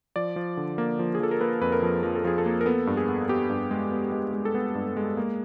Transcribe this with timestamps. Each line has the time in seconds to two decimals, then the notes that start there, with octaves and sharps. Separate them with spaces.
0.16 F3 D5
0.36 F3
0.57 D3
0.78 A#3
0.99 F3
1.15 G#4
1.20 F3 A4
1.31 A#4
1.41 A#3 B4
1.61 F2 B4
1.72 A#4
1.82 F3
2.03 F3 A#4
2.16 A4
2.24 F3 G#4
2.38 A4
2.46 A#3
2.61 A#4
2.66 B3 A4
2.87 G2
2.97 G#4
3.09 B3
3.28 B3 G4
3.50 G2
3.71 G#3
3.92 B3
4.12 G#3
4.34 G#3
4.45 A4
4.55 B3 G#4
4.75 G2
4.97 G#3
5.17 A#3